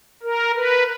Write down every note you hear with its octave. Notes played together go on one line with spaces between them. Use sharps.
A#4
B4